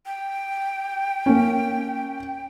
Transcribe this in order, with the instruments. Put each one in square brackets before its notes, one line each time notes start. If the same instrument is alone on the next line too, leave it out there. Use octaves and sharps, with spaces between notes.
[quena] G5
[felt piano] A#3 C#4